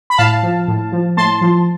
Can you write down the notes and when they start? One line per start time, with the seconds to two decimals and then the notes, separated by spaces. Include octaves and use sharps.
0.10 B5
0.18 A2 F5 A5
0.43 F3
0.68 A2
0.92 F3
1.17 A2 A5 C6
1.41 F3